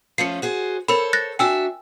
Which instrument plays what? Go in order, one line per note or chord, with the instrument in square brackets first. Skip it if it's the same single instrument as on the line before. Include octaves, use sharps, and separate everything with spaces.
[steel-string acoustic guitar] F3 A3 C#4 [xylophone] C7 C#7
[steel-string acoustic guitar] F#4 G#4 C5
[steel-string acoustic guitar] A4 C5 C#5 [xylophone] A#4 B5
[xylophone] F#6 A6 A#6
[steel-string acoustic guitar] D4 F#4 E5 [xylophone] G5 G#5 E6